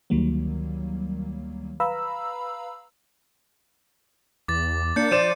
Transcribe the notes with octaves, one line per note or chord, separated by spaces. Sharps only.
D2 D#3 F#3 G3 A#3
B4 F5 A#5 B5 E6
E2 D6 A6
A#3 D4 G6 C#7
F3 C5 D5 D#7 E7